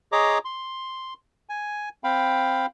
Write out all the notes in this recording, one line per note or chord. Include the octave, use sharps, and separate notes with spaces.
G#4 C#5 D#5 A#5 D6
C6
G#5
C4 F5 G5 B5